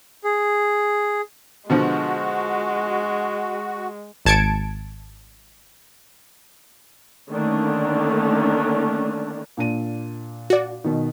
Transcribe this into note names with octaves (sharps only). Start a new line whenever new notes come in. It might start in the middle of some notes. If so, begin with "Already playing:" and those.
G#4
B2 D3 F3 G#3 F#4
G#1 A5 G#6 C#7 D7
D3 D#3 A3 A#3 C#4 D4
A#2 D4 D#7
F#4 D5
B2 D#3